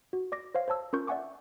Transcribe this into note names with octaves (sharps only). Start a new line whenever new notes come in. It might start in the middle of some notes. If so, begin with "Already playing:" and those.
F#4
D5 D6 A#6
C5 C#5 F5
C5 C#5 A5 E6
C#4 F4 A#4 C#6 G6
D5 E5 F#5 G#5 C#6 D6